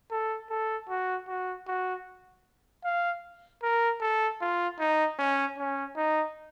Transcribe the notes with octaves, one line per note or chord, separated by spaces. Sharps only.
A4
A4
F#4
F#4
F#4
F5
A#4
A4
F4
D#4
C#4
C#4
D#4